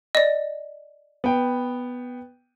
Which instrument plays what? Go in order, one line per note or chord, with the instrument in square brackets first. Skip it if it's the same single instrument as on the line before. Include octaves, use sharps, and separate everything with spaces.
[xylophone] D5 D#5
[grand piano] B3 G5